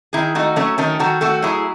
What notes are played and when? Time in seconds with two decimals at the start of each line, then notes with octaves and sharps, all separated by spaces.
0.13 D#3 E4 G#4
0.35 A3 D#4 F#4
0.56 F#3 A3 C#4
0.78 D#3 A3 C#4
1.00 D#3 F#4 A4
1.21 A3 F#4 A4
1.43 F#3 E4 G#4